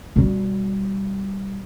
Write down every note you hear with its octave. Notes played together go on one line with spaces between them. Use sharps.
B2 G3